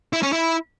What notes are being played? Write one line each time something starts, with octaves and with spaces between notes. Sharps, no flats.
E4
C#4
E4